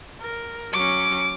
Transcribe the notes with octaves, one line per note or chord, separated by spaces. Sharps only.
A#4
F#3 C#4 D6